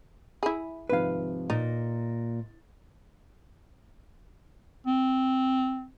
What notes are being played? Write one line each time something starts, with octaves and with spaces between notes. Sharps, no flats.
E4 G#4 B5
G#1 C3 F3 B4 F5
A#2 D#4 A6
C4